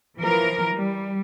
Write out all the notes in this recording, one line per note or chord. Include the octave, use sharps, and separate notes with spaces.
E3 F3 A#4
G3